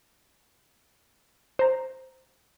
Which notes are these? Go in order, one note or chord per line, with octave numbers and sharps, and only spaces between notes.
C5 A#5